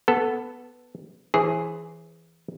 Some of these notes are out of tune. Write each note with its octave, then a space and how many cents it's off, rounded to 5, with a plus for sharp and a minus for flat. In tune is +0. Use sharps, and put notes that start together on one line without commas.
B3 +0 A4 +0
E3 +0 G#4 +0 C5 +35